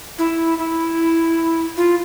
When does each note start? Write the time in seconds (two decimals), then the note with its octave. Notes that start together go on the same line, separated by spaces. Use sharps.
0.19 E4
0.58 E4
1.77 F4